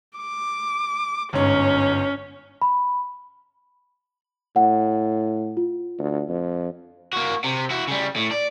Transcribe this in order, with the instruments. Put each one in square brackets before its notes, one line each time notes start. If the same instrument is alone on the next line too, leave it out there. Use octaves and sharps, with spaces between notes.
[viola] D6
[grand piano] G1 G#2 C#5 [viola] C#4
[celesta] B5
[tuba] A2 [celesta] F#5
[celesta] F4
[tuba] D2
F2
[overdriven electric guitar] A#3 F#4
C3
E4 F#4
C#3 G3
A2
D5